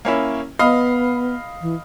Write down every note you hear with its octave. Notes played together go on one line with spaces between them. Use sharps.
A#3 C#4 E4
B3 D#5 F5 B5
E3